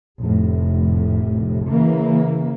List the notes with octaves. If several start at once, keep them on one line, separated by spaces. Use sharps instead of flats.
F1 A2
C#3 E3 A#3